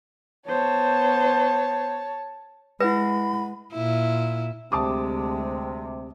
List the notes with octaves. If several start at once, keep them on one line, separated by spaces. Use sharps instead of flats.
B3 C5 C#5 A5
G#3 E4 B4 F#5 B5 A#6
A#2 E4
D2 C3 G#3 A5 D6 D#6